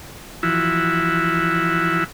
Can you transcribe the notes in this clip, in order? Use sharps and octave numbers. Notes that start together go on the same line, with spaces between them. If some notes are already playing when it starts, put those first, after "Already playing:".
E3 F3 E4 F#4